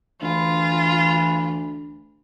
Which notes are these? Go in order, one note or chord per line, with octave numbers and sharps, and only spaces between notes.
D2 E3 F4